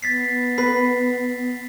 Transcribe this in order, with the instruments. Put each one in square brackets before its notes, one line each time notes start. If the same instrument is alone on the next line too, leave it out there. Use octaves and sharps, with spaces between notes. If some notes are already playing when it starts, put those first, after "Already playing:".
[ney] B3 [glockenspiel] A6 B6 C7
[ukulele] B4 [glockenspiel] B6 C7